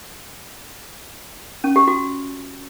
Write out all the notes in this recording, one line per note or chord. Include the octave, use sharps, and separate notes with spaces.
C#4
G4
F#4